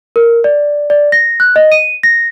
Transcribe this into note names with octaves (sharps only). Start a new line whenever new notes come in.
A#4
D5
D5
A#6
F#6
D#5
D#7
A#6